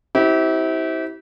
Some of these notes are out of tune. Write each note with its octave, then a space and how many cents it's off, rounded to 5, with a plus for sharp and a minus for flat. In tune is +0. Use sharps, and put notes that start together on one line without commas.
C4 +5 E4 -30 G4 -35